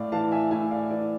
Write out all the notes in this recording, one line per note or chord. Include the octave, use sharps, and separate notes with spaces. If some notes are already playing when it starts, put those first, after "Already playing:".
Already playing: A2 D5 F5
E3 F5 A5
E5 G#5
A2 E5 G#5
D5 F5
E3 D5